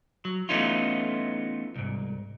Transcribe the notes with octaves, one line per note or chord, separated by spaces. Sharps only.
F#3
E3 A3 B3 C#4 D#4 F4
C2 G#2